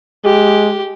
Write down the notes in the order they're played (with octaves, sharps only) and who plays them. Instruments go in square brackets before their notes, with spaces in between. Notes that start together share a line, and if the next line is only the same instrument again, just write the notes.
[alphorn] G#3 [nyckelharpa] G4